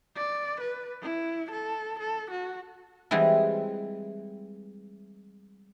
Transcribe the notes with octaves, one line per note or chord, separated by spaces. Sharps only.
D5
B4
E4
A4
A4
F#4
E3 G3 G#3 C4 E4